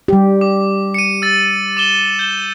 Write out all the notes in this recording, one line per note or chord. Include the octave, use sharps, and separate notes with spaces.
G3 G4
D6
C#7 D#7
E6 A6
D6 E7 G7
G6 E7 G7